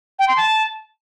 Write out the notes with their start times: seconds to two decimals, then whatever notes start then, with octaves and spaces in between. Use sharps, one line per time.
0.19 G5
0.28 C6
0.37 A5